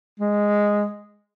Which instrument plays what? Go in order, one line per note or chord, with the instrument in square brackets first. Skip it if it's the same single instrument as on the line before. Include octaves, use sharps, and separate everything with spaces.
[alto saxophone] G#3